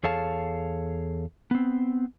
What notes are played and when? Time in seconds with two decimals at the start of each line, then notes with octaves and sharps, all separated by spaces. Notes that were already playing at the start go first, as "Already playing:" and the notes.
0.03 E2 G#4 A4 C#5 F5 A5
1.51 B3 C4